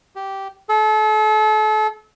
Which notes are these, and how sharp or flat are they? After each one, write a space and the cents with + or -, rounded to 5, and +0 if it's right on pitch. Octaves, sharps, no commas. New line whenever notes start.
G4 -10
A4 -35